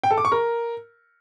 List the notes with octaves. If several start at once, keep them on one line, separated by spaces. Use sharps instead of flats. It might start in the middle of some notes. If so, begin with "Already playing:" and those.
G5
A4
D6
C#6
A#4